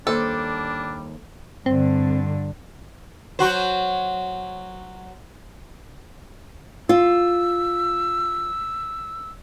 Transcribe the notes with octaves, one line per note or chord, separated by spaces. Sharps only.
D#2 G3 D4 A4 C5
G2 D3 C4
F#3 F#4 C5
F4 E6